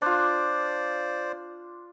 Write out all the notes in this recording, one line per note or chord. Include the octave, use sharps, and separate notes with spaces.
D4 F4 C5 D5